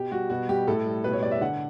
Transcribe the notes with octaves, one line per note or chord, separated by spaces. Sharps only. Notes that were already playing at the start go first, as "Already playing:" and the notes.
Already playing: B2 G4
G3 F#4
B2 F#4
G3 G4
A2 A4
G3
B2 B4
C#5
G3 D5
E5
D3 F#5